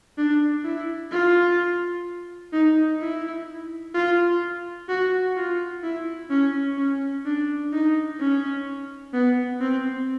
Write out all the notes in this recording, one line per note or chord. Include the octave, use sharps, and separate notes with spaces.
D4
E4
F4
D#4
E4
F4
F#4
F4
E4
C#4
C#4
D4
D#4
C#4
B3
C4